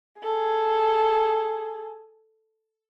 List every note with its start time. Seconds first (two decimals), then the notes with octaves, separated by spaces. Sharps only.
0.21 G#4 A4